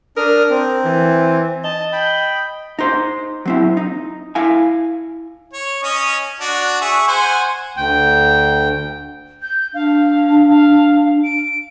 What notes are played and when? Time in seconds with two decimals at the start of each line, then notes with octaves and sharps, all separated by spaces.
0.17 D4 A#4 D#6 F6
0.50 C4
0.85 E3
1.64 D#5 A5
1.93 G5 B5
2.79 D#4 C5
3.45 F#3 C4 E4
3.77 D#4
4.35 E4 F5 G#5
5.53 C#5
5.83 C#4 C#5 D#5
6.40 D4 F#4
6.81 G#4 E5 C#6
7.08 C5 F#5 G#5
7.77 D2 G5
9.42 G6
9.74 D4 F5
10.47 F5
11.24 D7